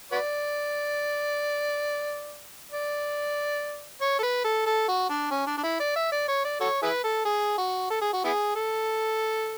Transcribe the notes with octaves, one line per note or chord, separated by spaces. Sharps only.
F#4 B4 D5
D5
C#5
A4
B4
A4
A4
F#4
D4
C#4
D4
D4
E4
D5
E5
D5
C#5
D5
F#4 A4 C#5
E4 G#4 B4
A4
G#4
F#4
A4
G#4
F#4
B3 E4 G#4
A4